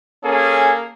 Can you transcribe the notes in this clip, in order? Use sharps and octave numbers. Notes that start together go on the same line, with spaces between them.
A#3 C#4 G#4 A4 G#5